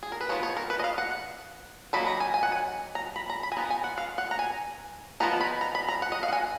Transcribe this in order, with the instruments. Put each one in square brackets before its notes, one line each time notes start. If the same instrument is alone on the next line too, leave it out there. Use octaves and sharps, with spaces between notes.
[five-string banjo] G#4
A#4
B4
F3 B3 D#4 C#5
C#5
A#4
B4
D#5
F5
F#5
D#3 F#3 A#3 D#4 B5
A#5
G#5
G#5
F#5
G#5
A#5
B5
A#5
B5
G#5
F3 B3 D#4 A#5
G#5
F#5
F5
F#5
A#5
G#5
F3 G#3 B3 D#4 A#5
B5
A#5
B5
A#5
F#5
D#5
F5
F#5
G#5